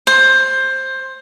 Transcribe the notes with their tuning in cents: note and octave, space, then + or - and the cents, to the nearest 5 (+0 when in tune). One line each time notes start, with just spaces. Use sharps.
C5 +15